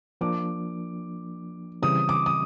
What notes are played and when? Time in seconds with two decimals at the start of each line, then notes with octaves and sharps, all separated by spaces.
0.21 F3 A#3 D4 D6
1.82 C#3 E3 G3 C4 D#6
2.09 D6
2.26 D#6